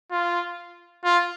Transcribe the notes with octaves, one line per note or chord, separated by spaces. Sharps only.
F4
F4